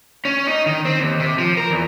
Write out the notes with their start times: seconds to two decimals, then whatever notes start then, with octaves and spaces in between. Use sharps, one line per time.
0.25 C#4
0.47 D#4
0.66 D#3
0.85 C4
0.99 D#2
1.20 C3
1.38 F3
1.57 A#4
1.71 E2